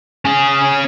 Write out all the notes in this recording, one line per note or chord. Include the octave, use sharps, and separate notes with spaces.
C#4 G#4